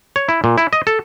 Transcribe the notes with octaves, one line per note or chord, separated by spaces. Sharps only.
C#5
E4
A#2
E4
D#5
A4